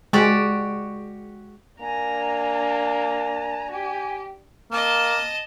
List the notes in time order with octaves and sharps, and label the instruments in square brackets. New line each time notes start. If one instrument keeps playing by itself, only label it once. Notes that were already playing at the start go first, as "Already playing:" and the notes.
[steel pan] G#3 [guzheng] F#4 G4 D5
[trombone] A#3 [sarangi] D4 [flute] G#5 [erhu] A#5
[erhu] G4 [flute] G#5
[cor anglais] A#3 [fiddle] D#5 A5